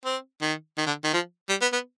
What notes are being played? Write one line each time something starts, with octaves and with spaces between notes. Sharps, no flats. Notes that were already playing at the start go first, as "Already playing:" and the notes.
C4
D#3
D#3
D3
D#3
F3
G3
B3
B3